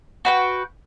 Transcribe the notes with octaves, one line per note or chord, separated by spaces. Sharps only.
F#4 B4 G5